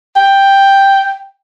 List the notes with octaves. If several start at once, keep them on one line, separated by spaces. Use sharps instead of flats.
G5